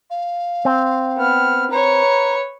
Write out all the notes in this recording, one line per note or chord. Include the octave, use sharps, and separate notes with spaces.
F5
C4
B3 F6
B4 C#5 A#5